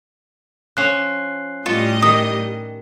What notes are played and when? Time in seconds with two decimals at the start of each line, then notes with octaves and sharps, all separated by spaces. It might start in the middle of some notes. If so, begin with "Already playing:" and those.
0.77 F3 C#4 F#6 C7
1.66 A2 G3 F4 D#5 C#6
2.02 D#3 D#6